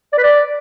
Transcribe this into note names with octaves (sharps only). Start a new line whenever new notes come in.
D5
B4
D5